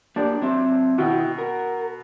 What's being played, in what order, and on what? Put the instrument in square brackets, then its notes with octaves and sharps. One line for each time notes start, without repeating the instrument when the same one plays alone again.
[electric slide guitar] A#3 G4 D5 [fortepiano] D4
[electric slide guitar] F#3 C4 E5
[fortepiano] B2 [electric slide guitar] D#3 E4 G5
[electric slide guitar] A#4